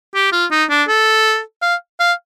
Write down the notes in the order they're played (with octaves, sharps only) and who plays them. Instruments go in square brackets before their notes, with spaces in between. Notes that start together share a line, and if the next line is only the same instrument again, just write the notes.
[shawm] G4
F4
D#4
D4
A4
F5
F5